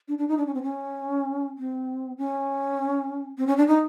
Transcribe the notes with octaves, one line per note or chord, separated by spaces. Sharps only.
D4
D4
D#4
D4
C#4
C4
C#4
C4
C#4
C4
C#4
D4
D#4